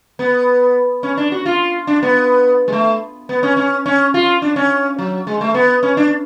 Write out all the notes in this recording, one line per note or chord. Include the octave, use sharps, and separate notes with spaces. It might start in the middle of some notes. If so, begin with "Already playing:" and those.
B3
C#4
D4
F#4
F4
D4
B3
G#3
A3
B3
C#4
C#4
C#4
F4
D4
C#4
F#3
G#3
A3
B3
C#4
D4